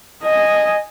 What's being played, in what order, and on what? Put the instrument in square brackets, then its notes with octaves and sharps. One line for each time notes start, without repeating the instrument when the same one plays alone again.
[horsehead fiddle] D#5 G#5